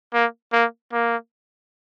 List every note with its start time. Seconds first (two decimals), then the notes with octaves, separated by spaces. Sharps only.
0.13 A#3
0.52 A#3
0.92 A#3